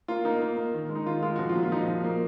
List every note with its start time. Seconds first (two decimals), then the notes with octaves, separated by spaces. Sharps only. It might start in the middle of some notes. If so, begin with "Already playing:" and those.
0.08 A#3 F4
0.25 A#3 D#4
0.42 A#3
0.57 A#3
0.74 D#3
0.89 G#3
0.95 D#4
1.06 D#3 F4
1.23 G#3 F4
1.36 F3 F#4
1.49 F4
1.55 A#2
1.63 F4
1.72 F3 D#4
1.88 F3
2.04 A#3